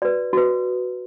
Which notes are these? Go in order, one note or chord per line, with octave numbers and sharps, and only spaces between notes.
F#4 B4 D5
F#4 B4